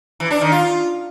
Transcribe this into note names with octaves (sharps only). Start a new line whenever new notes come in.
E3
D4
D#3
F4